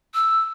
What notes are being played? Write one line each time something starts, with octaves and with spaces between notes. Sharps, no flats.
E6